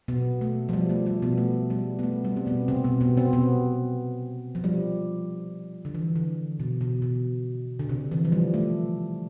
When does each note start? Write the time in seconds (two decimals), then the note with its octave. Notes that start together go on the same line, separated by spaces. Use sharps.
0.08 B2 B3
0.41 A3
0.69 F3
0.73 G3
0.89 A3
1.06 G3
1.22 B2 B3
1.38 A3
1.70 G3
1.99 B3
2.03 A3
2.24 G3
2.37 C4
2.46 B2 B3
2.68 C3 C4
2.84 B2 B3
3.01 B2 B3
3.17 C3 C4
3.33 B2 B3
4.55 F3
4.64 G3
5.85 D3
5.95 E3
6.15 D3
6.60 B2
6.81 B2
7.02 B2
7.79 D3
7.89 C3
8.11 E3
8.25 F3
8.32 G3
8.54 A3